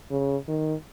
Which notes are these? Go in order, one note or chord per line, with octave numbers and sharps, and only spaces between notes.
C#3
D#3